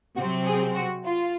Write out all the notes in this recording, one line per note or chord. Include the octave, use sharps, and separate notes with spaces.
C3 F#3 C4 F#4
G#4
F#4
F4